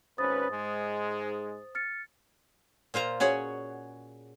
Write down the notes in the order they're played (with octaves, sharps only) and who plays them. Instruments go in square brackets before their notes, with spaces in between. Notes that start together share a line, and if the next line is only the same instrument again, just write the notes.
[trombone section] G#1 C#4 B4 [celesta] C5 D#6 A6
[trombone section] G#2 G#3
[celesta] F6 A6 C#7
[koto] A#2 F4 C5 A#5
C#4 F#4 G#4 C#5 F#5